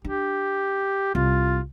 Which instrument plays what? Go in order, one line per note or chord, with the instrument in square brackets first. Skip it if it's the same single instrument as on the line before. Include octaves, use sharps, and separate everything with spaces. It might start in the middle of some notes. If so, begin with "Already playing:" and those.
[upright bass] D4 [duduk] G4
[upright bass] C2 [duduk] F4